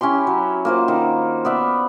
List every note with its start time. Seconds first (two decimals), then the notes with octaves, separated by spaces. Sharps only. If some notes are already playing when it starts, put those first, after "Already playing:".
0.01 C#4 E4 G4 C6
0.27 F#3
0.65 A#3 F4 C5
0.88 D#3
1.45 B3 D5 E5